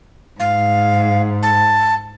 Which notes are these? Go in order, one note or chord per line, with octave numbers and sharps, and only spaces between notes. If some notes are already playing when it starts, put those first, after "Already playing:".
G#2 F5
A5